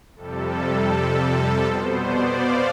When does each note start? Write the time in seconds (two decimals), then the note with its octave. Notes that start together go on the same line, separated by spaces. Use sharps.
0.15 F2 C3 G3 A4
0.52 A4
1.63 B2 B3 C5
1.99 D5
2.35 F5